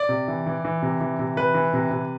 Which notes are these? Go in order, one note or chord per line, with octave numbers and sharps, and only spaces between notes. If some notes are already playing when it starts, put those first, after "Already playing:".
Already playing: D5
C3
E3
E3
E3
C3
E3
C3
E3 B4
E3
C3
C3